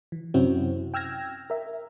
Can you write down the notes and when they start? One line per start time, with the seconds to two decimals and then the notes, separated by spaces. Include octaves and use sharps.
0.12 E3
0.34 F#2 C3 C4 C#4 E4 F#4
0.94 G5 E6 F6 G#6 A#6
1.50 A#4 E5